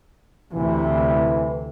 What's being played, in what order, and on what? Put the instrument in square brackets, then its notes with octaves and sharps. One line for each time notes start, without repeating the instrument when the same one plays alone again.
[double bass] D2 C3 [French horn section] E3